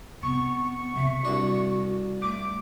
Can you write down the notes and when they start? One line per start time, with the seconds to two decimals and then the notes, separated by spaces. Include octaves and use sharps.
0.23 C3 B3 C#6
0.95 C3 C4 E5
1.25 C2 D4 F#4
2.22 A3 D6